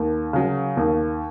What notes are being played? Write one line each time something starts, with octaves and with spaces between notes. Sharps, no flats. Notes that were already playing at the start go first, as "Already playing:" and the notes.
Already playing: D#2
C#3 F#3
D#2